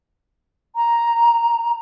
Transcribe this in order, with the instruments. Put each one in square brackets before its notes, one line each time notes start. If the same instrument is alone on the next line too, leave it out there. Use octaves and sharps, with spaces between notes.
[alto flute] A#5